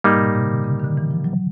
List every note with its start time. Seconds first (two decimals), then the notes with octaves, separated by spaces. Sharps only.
0.04 G#2 G3 A#3 D#4
0.14 B2
0.23 A#2
0.35 C3
0.43 D3
0.55 C3
0.64 C#3
0.80 D#3
0.84 D3
0.97 E3
1.11 F3
1.24 F#3